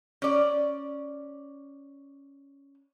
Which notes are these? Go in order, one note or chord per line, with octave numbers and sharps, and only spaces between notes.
C#4 D5